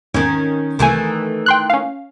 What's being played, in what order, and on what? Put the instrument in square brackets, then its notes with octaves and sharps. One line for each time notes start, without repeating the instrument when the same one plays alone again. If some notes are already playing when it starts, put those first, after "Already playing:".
[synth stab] E2 G#2 [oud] D#3 C#4
[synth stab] C2 C3 G#5 [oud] D#3 E3 A3
[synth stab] G5 C6 F#6
C#4 F5